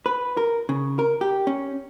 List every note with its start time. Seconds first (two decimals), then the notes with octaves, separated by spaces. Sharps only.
0.06 B4
0.37 A#4
0.69 C#3
0.99 A#4
1.21 G4
1.47 C#4